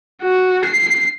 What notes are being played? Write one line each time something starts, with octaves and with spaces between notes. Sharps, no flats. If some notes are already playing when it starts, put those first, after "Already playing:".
F#4
C7